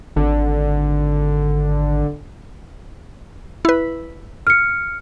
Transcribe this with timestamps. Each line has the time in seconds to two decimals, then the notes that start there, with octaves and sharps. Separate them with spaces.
0.16 G#1 D3
3.65 E4 B4
4.47 F6 C#7